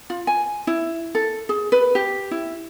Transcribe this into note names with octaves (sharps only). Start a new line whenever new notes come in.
F4
G#5
E4
A4
G#4
B4
G4
E4